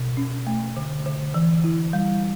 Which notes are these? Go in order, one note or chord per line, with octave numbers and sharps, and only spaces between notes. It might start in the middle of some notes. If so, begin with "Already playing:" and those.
Already playing: B2
C#4
A3
D3
D3
E3
E4
G3